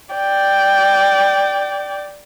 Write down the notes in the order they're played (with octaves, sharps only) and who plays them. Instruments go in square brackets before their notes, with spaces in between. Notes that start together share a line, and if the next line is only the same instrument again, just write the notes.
[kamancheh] D5 G5